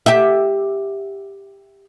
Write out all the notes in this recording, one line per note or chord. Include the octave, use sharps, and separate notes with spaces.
G4 E5